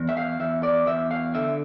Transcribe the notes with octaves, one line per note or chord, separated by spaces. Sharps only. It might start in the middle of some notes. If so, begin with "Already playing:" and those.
Already playing: E2
E5
F5
E2 E5
D5
E2 E5
F5
D3 E5